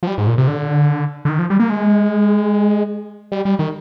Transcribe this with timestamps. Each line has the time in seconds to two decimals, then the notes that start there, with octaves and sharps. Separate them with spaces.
0.03 F3
0.07 G3
0.18 G#2
0.27 A#2
0.38 C3
0.48 D3
1.25 D3
1.29 D#3
1.39 F3
1.50 G3
1.60 A#3
1.70 G#3
3.32 G3
3.45 G3
3.59 D#3